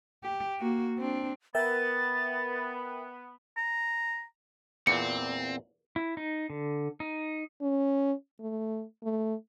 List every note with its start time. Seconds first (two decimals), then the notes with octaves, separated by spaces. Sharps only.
0.24 G4
0.60 A#3 F#4
0.98 C4 D4
1.55 B3 A#4 E5 G5 A6
3.57 A#5
4.87 E2 A#2 C4 C#7
5.96 E4
6.17 D#4
6.50 D3
7.00 D#4
7.61 C#4
8.40 A3
9.03 A3